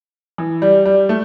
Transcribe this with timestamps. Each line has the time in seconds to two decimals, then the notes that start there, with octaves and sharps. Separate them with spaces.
0.38 E3
0.62 G3
0.86 G3
1.09 A3